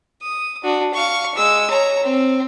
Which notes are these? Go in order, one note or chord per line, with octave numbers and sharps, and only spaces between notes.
D#6
D4 F#4
F5 C#6
G#3 E6
C#5 A#5
C4